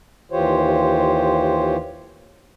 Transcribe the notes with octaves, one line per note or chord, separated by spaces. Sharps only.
D#2 E3 F4 G4 C5 C#5